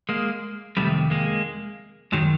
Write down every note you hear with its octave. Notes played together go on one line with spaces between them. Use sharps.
G#3 A#3
F2 C3 D#3 G3 A3
G#3 A#3
F#2 D#3 F#3 G#3